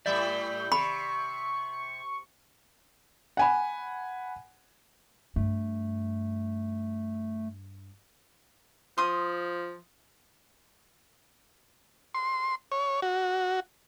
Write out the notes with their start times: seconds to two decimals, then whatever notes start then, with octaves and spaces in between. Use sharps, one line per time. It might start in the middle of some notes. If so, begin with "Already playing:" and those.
0.06 A2 G3 D5 E5 G6
0.72 C3 B5 C#6
3.37 F#5 G#5 B5
5.36 G2 A3
8.98 F3 C6 D#6
12.15 C6
12.72 C#5
13.02 F#4